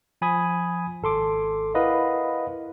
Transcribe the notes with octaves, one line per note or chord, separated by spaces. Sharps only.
F3 G#5 B5 D#6 G#6
G#1 A4 C6 D6
E4 A#4 B4 D#5 F5 F#5